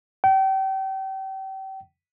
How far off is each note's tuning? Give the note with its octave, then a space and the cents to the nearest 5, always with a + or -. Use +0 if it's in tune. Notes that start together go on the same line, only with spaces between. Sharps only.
G5 -35